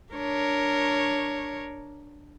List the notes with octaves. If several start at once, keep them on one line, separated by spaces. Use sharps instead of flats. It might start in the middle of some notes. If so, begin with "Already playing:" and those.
D4 A#4 C#5